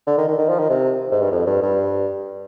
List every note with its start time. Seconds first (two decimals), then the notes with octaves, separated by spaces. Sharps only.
0.07 D3
0.18 D#3
0.28 D#3
0.39 D#3
0.49 F3
0.59 D#3
0.70 C3
1.12 G#2
1.22 G2
1.32 F2
1.47 G2
1.63 G2